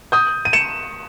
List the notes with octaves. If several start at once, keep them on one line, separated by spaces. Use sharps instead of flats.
D#6 G6
D#7
C#7 E7